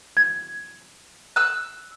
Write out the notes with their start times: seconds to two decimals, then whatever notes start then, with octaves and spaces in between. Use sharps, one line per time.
0.17 G#6
1.36 E6 F#6